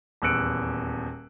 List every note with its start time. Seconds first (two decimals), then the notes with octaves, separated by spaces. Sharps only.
0.22 D#1 E2 E6 F#6 C#7 D7